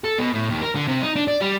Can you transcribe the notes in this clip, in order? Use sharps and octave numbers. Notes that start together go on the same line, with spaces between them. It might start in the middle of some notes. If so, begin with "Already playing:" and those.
A4
B2
A2
D#2
A#4
D3
C3
D#4
D4
D5
G3